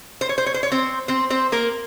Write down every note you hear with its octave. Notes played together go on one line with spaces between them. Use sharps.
C5
C#5
C5
C#5
C5
C#5
C4 C5
C4 C5
C4 C5
A#3 A#4